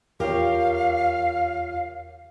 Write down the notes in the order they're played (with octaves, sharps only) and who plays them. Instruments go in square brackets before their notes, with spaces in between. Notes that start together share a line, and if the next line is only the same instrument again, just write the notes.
[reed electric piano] E2 F4 C#5 [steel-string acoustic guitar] G4 A#4 [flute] F5